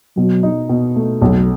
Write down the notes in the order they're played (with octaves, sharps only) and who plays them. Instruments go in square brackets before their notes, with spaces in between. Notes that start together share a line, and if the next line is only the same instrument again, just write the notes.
[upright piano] B2 [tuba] F#3
[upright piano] D#4
B2
A3
[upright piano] B1 [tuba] F#3